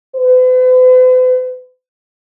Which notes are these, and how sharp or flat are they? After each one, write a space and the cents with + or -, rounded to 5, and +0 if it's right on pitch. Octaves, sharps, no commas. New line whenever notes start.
B4 +45